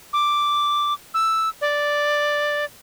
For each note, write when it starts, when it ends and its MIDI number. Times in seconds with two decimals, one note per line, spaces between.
0.13 0.94 86
1.14 1.49 88
1.61 2.65 74